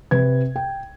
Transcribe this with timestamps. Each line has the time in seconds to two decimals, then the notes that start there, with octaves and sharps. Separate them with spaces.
0.11 C3 B4 G#6
0.56 G5